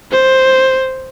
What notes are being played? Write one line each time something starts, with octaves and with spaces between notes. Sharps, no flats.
C5